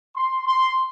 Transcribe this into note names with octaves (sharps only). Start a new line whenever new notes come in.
C6
C6